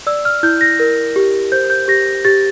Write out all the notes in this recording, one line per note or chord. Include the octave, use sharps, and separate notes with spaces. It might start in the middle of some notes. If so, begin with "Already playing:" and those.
D5 E6
F6
E4 G6
A#6
A#4
G4
C5 G6
G6
G4 A#6
G4 A6